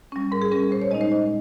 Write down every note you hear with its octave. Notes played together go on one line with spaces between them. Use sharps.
G3 C#4
G#2 A#4
G#4
G3 C#4 A#4
A#2 C5
C#5
G#3 D#4 D#5
C5
A#2 D#5